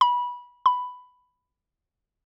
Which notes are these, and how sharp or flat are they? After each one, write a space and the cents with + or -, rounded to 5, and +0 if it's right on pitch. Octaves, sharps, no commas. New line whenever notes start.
B5 -20
B5 +10